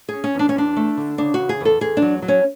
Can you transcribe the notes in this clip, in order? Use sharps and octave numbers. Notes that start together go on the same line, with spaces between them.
C#4 G#4
C#4
E2 D4
C#4
E2 D4
A3
D3
C#3 D4
F#4
E2
G#4
E2 A4
E2 G#4
D4
F#3
F#3
C#4